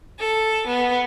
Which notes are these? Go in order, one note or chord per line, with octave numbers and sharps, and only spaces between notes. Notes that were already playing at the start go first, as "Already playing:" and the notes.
A4
B3